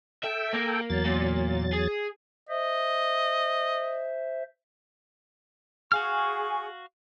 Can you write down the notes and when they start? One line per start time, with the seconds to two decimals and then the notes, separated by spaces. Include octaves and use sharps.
0.24 A4 E5 G5
0.54 A#3
0.90 E2 F#3 A6
1.05 A#2
1.73 G#4
2.49 C5 D#5 E5
5.92 F#4 G#4 F5 G#5 C#6 F6